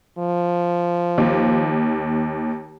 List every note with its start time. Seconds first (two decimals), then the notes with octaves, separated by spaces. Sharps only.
0.18 F3
1.18 D#2